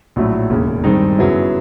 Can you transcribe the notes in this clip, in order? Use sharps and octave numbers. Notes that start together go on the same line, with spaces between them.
A#1 A2 F#3 A3
E1 D#2 C#3
G2 D#3 G#3 C4 D#4
F#2 C#3 F#3 B3 E4